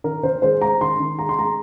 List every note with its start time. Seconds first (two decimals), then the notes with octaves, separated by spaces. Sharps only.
0.04 D#3 A#4
0.23 D#3 C5
0.42 G#3 C5
0.61 G#3 A#5
0.81 D#3 C6
0.99 D#3
1.19 G#3 A#5
1.29 C6
1.38 G#3 A#5